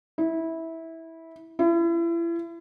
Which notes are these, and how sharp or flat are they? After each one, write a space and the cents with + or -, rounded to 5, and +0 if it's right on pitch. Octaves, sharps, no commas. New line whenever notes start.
E4 -15
E4 +35